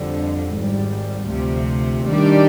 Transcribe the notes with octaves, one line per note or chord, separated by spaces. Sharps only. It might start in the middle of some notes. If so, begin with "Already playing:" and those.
Already playing: F2 D3 G3
G#1 G#2 G3
D2 C3 F3
D#3 G3 D4 G4 D5